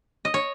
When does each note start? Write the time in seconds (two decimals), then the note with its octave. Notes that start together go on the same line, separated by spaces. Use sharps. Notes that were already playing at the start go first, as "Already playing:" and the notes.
0.25 D#5
0.34 C#5